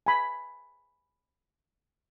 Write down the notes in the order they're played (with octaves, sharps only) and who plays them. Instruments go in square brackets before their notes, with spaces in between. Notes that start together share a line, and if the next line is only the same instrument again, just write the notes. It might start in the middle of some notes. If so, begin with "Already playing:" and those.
[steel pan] G#5 B5